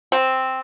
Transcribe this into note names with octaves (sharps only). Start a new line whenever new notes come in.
C4